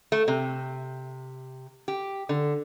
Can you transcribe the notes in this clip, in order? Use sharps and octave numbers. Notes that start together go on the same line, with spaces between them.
A3
C3
G4
D3